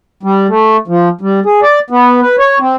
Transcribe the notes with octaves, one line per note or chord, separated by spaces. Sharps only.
G3
A3
F3
G3
G#4
D5
B3
B4
C#5
C4